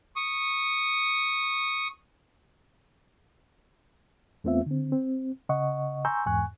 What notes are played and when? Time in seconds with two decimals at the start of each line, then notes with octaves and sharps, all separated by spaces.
0.16 C#6 D#6
4.44 E2 A3 B3 C4 F4 E5
4.66 D3 C4
4.92 C4
5.49 C#3 D#5 F#5 C#6
6.05 G#5 A#5 C6 C#6 E6 G6
6.26 E2 G#2 G#5 C#6 F#6